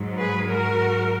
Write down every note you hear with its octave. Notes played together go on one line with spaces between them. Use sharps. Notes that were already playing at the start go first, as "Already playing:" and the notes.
Already playing: G#2 F#3
G#4 B4
G#2 F#3 F#4 A#4